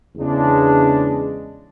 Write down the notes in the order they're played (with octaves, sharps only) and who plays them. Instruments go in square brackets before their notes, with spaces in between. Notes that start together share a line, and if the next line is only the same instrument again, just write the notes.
[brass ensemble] E2 C#3 G#3 D4